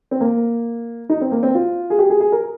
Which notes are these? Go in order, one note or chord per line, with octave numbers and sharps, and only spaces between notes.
C4
A#3
D#4
C4
A#3
C4
F4
G#4
G4
G#4
G#4
A#4